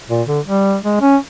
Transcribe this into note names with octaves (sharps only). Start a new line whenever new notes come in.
A#2
D3
G3
G#3
C#4